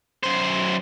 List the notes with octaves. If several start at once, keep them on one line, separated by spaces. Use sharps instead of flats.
F#2 C5